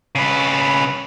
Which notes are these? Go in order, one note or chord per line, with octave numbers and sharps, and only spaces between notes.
C#3 B4